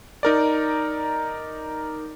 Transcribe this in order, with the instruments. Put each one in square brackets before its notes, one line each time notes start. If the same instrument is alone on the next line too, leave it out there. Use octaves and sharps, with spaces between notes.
[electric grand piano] D#4 A#4 D5